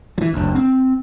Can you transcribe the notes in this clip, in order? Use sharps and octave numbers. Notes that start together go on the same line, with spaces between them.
E3 F#3
F#1 D2
C4